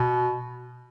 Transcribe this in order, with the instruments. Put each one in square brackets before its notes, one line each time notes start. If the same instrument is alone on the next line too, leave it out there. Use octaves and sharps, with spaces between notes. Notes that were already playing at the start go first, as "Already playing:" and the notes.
Already playing: [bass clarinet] B2